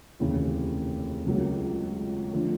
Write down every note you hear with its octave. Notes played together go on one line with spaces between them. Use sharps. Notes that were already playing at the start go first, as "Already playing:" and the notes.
F1 D#2 C#3 E3
C#2 C#3 F#3 A#3
D3 F3 A3